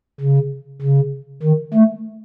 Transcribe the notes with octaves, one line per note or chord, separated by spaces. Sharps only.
C#3
C#3
D#3
A3